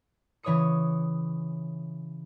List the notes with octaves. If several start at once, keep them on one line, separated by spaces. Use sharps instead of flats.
C#3 E3 C#5 C#6 D#6 C#7